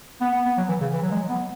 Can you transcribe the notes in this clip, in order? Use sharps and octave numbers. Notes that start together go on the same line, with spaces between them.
B3
B3
B3
F#3
E3
C#3
E3
F#3
G#3
F#3
B3